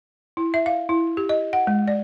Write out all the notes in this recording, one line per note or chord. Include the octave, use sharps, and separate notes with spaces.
E4
E5
F5
E4
G4
D#5
F#5
G#3
D5